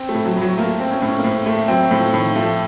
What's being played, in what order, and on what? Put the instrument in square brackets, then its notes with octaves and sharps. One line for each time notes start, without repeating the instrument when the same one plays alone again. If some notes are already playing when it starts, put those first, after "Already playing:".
Already playing: [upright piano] C4
[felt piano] A3
[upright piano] A2
[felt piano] F#3
[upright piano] A2
[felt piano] F#3
[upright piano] A3 [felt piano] A#3
[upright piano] C4
[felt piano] C#4
[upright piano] A2
[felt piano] C#4
A#3
[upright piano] A2 [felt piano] C4
[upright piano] A3 [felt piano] A#3
[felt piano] F#3 [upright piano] C4
[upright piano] A2 [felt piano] F3
[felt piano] F3
[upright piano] A2 [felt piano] D#3
[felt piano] F3 [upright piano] A3